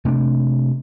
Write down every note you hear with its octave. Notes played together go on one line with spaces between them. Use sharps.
C3 A3 D4